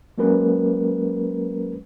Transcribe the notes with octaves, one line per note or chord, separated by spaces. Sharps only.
F#3 G#3 A#3 C#4 A#4 B4